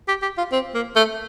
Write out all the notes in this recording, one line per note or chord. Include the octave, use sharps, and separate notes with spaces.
G4
G4
F4
C4
A#3
A3